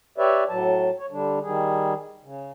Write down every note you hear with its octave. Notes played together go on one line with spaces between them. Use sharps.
G4 B4 C#5 D5 E5
A2 F#3 A5
C#5
D3 G3 D4
D#3 G3 G#4
C#3